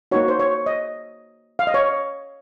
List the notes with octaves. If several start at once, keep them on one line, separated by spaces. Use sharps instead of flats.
A#3 D#4 F#4 C#5
C5
C#5
D#5
F5
D#5
C#5